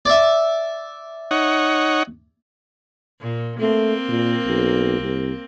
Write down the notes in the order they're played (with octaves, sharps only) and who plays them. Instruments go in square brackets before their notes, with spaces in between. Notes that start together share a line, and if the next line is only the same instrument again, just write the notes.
[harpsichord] D5 E5
[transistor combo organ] D#4 C#5 F#5
[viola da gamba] A#2
[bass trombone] A3 [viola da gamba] A#3 C4
[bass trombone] A#2
B1
C2